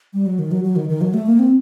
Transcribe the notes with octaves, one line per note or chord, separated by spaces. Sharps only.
G3
F#3
D#3
F#3
F#3
D#3
D#3
F#3
A3
A#3
C4